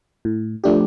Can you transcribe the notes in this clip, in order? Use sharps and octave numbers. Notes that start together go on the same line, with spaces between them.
A2
F3 A3 D4 G4